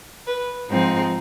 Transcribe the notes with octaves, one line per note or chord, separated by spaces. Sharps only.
B4
G#2 F3 G#3 C4 D#4